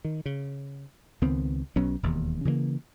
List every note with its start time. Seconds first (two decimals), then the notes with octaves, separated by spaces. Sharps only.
0.05 D#3
0.26 C#3
1.22 C#2 D#3 B3 C4
1.76 B1 F#3 B3 C#4
2.03 E1 D#2
2.45 C#3 E3 F#3 A#3